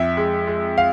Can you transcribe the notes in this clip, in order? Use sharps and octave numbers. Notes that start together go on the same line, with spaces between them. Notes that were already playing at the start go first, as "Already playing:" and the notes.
Already playing: F2 E5
G#3
G#3
F5